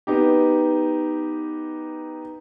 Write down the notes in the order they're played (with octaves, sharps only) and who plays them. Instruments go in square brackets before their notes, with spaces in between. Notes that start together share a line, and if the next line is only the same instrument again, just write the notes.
[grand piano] B3 D#4 G4